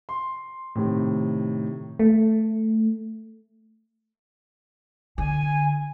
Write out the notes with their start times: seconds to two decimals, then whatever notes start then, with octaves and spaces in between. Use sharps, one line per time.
0.09 C6
0.75 A2 C3 D#3
1.99 A3
5.18 D3 G#5